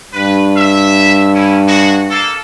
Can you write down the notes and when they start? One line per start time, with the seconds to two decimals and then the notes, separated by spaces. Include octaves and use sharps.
0.13 G2 B4
0.56 E5
1.34 C#4 E4
1.67 G#3 F#4
2.10 A#3 A4